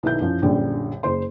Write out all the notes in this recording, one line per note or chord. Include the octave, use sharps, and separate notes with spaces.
B1 B2 D#3 E4 G6
F#2 E3 F3
A#1 F#2 D3 G3
F#1 C5 C6